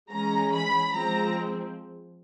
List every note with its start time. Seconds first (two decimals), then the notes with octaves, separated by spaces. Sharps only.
0.10 E3 G#3 C#4 A#5
0.52 B5
0.92 F3 G#3 C4 A#5